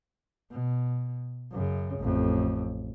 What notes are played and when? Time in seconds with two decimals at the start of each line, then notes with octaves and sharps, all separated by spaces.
0.51 B2
1.51 F#2 C#3
2.00 A1 F2